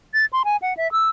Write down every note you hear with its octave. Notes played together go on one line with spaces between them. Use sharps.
A6
C6
G#5
F#5
E5
E6